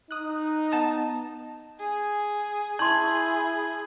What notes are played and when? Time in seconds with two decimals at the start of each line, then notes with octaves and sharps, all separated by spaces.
0.11 D#4 D#6 F#6
0.72 B3 A5 D#6
1.79 G#4
2.79 E4 G#4 A5 C6 G6 G#6 F#7